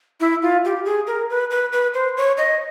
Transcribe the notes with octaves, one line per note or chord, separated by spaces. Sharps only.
E4
F4
G4
G#4
A#4
B4
B4
B4
C5
C#5
D#5